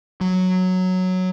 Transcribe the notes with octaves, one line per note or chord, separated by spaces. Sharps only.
F#3